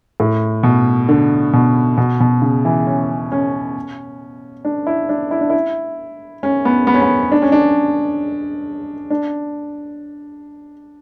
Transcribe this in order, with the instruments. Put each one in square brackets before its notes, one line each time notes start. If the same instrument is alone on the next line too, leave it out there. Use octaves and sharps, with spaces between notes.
[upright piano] A2
B2
D3
B2
B2
B2
C#3
E3
C#4
C#4
D4
E4
D4
E4
D4
E4
C#4
B3
B3
C#4
B3
D4
C#4
D4
D4